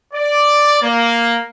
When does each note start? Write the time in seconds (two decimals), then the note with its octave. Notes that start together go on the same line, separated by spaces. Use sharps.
0.14 D5
0.82 A#3